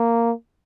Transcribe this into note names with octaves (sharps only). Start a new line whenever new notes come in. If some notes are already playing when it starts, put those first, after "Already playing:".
Already playing: A#3